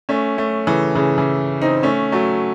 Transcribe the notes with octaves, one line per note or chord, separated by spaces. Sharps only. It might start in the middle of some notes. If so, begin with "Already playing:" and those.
A3 C#4
A3 C#4
C#3 E3
C#3 E3
C#3 E3
C4 D#4
A3 C#4
F#3 A3